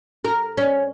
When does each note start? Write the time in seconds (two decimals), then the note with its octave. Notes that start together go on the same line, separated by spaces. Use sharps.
0.25 A#4
0.57 C#4